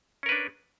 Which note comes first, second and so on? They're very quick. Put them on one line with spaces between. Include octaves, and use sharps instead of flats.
C#4 A#4 B4 D4